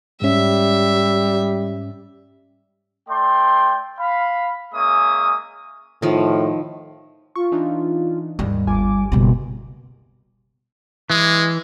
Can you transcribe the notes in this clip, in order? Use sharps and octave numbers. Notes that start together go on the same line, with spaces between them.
G#2 G3 C#4 E5
A3 D5 G5 C6
F5 B5
G#3 A#3 C#4 E5 D#6
A2 D#3 F3
F4 C#6
E3 D4 D#4
D#2 G#2 G3
G1 F4 G#5 D6
F#1 B2 G3
E3 G#3